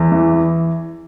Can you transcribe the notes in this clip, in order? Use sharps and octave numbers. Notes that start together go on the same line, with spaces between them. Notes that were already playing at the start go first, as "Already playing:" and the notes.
Already playing: E2
E3